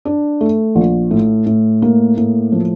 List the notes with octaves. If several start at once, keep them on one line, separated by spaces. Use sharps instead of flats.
D4
A3
A#1
A2
A2
A#3
A2
F3